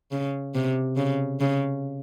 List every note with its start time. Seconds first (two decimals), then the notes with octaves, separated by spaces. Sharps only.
0.11 C#3
0.55 C3
0.97 C#3
1.40 C#3